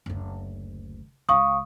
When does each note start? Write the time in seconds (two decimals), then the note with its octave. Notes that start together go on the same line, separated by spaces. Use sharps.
0.06 F#1 D2
1.29 C#2 F5 C#6 D#6